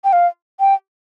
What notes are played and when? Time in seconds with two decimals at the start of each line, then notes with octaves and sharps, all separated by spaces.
0.04 G5
0.13 F5
0.60 G5